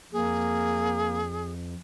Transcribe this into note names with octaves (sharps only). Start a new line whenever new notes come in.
F2 A#3 G#4